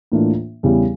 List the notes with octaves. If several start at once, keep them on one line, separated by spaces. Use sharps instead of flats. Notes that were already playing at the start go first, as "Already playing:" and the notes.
A2 E3 A#3 D4 F4
E2 C#3 G3 C#4 E4